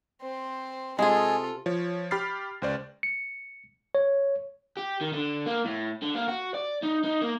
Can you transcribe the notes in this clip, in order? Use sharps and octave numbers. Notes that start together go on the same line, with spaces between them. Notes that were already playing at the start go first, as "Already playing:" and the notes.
C4 C5
C3 G#3 F4 G#4 A4 D#5 G#5
F3 C#5
G4 B5 F6 A6 C7
C#2 C5 D5
C#7
C#5
G4
D#3
D3
A#3
A2
D3
A#3
F#4
D5
D#4
D#4
A#3